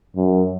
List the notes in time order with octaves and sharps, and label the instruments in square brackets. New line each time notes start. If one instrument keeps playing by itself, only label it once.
[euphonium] F#2